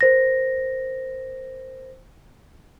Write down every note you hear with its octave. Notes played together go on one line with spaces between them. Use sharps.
A#4 C5 A#6